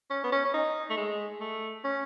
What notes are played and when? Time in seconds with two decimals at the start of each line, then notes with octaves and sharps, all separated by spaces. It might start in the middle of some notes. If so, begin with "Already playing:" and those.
0.10 C#4
0.24 B3
0.32 C#4
0.45 C#4
0.54 D#4
0.90 A3
0.97 G#3
1.40 A3
1.84 C#4